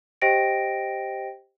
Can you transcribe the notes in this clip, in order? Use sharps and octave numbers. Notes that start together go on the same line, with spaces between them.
G4 C5 D#5 G5 A#6 D7